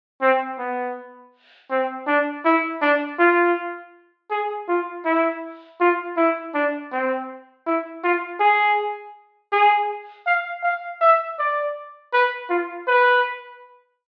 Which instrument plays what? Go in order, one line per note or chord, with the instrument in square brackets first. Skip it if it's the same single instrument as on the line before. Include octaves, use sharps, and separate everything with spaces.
[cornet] C4
B3
C4
D4
E4
D4
F4
G#4
F4
E4
F4
E4
D4
C4
E4
F4
G#4
G#4
F5
F5
E5
D5
B4
F4
B4